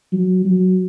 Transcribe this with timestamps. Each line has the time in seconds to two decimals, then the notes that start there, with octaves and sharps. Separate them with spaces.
0.12 F#3
0.45 F#3